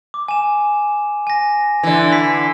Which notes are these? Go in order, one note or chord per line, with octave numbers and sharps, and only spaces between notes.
D6
G#5 E7
G#5 A#6
D3 E3
B5 B6 C7